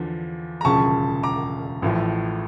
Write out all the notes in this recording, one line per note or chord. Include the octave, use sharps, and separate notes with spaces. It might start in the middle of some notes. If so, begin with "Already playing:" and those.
Already playing: E2 D3 F3
A#5
E1 D2 C#3 F3 A5 C#6
A#5 D6
A1 A2 F3